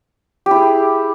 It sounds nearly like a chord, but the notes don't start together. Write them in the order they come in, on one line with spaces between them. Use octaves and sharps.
G4 E4 G#4